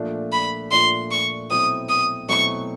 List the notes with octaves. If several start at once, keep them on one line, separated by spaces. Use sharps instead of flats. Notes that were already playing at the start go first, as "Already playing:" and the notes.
Already playing: A#2 F3 A3 D4 F4
B5
A#2 F3 A3 D4 F4 C6
C#6
B2 F#3 A3 C4 E4 D#6
D#6
B2 F#3 A3 C4 E4 C#6